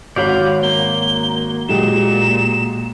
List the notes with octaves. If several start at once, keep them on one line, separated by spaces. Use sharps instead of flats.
G#1 F#4 C#5 D5 F5 B5 G6
A#3 G7
A#2 F#3 G#3 G4 E7